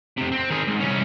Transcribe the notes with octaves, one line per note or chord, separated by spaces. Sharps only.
F2 C3
C4
D#3 G#4
G#2
C2 C#4